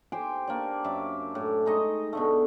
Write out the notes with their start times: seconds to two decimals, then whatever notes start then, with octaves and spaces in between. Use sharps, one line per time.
0.12 G4 C5 G5 G#5
0.48 A#3 D4 D5
0.84 F#2 D5 E5 D6
1.35 A2
1.66 G#3 D#4 D#5 C#6
2.13 B2 D3 A3